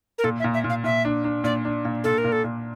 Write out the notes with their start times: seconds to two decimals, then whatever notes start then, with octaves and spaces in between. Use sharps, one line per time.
0.18 A#4
0.24 A#2 A4
0.39 E5
0.44 A#2
0.54 E5
0.64 A#2
0.70 F5
0.84 A#2 E5
1.05 D4
1.24 D4
1.44 A#2 D5
1.65 D4
1.85 A#2
2.04 A#2 A4
2.18 A#4
2.24 A#2
2.32 A4
2.44 A#2